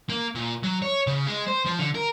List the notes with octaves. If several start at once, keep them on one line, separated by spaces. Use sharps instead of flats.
A#3
A#2
F#3
C#5
C#3
G#3
C5
F3
D3
A#4